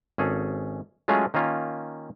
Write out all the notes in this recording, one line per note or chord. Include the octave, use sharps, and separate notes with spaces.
G#1 C#4 G#4 A4
F#3 G#3 A3 C#4 F4 G#4
D#3 A#3 C#4 F4